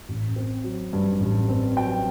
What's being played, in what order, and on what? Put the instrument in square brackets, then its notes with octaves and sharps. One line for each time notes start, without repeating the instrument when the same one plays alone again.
[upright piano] A1
C4
F#3
G2
A1
C4
F#3 G5